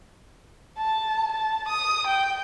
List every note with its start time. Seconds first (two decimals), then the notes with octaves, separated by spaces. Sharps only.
0.77 A5
1.31 A5
1.68 D#6
2.07 G5